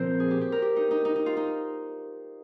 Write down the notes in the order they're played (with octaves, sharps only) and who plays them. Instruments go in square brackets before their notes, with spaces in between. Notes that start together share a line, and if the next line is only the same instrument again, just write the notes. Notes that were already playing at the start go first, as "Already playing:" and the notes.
Already playing: [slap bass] A#2 F3 C4 [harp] A#4 C5
[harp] G#4
G4
G4
A#4
G4
D#4
D#4
D#4
D#4
F4
D#4